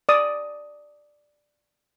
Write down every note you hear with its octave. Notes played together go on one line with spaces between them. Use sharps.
D5 D#6